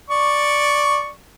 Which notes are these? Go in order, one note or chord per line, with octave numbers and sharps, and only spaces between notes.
D5 C#6